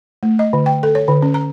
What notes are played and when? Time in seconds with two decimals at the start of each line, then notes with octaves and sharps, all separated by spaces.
0.23 A3
0.39 D#5
0.53 D3
0.66 G5
0.83 A4
0.95 C#5
1.08 D3
1.23 C#4
1.34 A#5